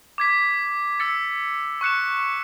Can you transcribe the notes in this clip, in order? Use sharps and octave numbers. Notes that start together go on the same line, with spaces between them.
D6 G#6 B6
E6 A6 C#7
C#6 F#6 C#7 E7